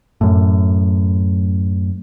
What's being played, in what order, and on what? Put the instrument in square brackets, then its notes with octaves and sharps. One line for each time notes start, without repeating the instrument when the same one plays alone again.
[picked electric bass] F#2 A2